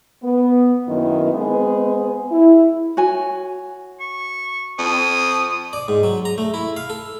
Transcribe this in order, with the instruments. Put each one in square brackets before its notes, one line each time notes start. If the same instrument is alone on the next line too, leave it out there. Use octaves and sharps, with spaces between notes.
[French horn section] B3
F#2 D#3 A#3 B3 E4
G#3 B3 C4 G#4
E4
[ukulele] F#4 C#5 G#5
[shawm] C#6
[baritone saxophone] F2 [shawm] D#6
[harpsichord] D5
G#2
F#3
A#5
A3
E4
F5
A4